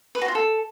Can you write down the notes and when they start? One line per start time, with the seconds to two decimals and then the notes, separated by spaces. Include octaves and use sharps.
0.15 B4
0.22 F#4
0.28 F4
0.35 A4